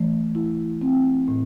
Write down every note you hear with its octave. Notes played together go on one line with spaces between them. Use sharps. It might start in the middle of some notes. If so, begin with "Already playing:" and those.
Already playing: E3 A3
E4
C4
A2